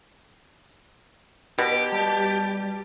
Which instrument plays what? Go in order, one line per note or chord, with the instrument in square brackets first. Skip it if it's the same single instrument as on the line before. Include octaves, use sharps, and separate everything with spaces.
[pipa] B2 [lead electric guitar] G4
[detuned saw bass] G3 [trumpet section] A5